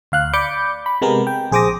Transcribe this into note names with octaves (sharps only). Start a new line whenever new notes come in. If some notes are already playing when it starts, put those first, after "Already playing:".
D2 F5 F#6
D5 B5 D6 G6 C#7
B5
C3 G#3 B3 A#4
G5
A#1 G#4 C5 D6 D#6 A#6